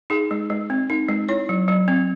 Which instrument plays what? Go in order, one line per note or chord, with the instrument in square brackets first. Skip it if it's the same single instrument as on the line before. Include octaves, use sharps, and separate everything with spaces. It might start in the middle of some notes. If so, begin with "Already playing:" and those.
[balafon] D#4 G#4
G#3
G#3
C4
D#4
G#3
E4 C#5
F#3
F#3
C4